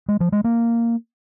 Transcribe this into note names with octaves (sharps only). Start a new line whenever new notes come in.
G#3
F3
G#3
A#3